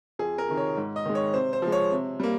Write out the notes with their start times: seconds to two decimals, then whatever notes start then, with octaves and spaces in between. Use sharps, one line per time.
0.19 F2 G#4
0.38 A#4
0.48 C3 D#3
0.57 C#5
0.77 G#2
0.96 D#5
1.05 D#3 G#3
1.15 C#5
1.34 C3 C5
1.53 C5
1.62 F3
1.67 G#3
1.72 C#5
1.91 C3
2.20 G3 A#3